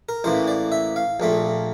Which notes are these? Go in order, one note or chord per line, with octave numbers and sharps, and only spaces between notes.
A#4
A1 A2 E3 A#3 C5
D5
E5
F5
A#1 A#2 A3 C4